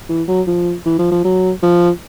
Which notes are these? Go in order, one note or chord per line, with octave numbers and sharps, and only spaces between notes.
E3
F#3
F3
E3
F3
F3
F#3
F3